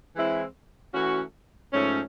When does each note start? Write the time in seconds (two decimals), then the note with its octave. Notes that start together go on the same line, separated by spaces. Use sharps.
0.15 E3 G#3 C4 E4
0.93 E3 A3 C#4 F#4
1.72 G#2 F3 A3 C#4